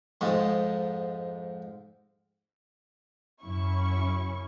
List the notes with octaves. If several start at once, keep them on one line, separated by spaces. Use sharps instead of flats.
F2 G#2 G#3
F#2 C#3 C#4 E4 C#6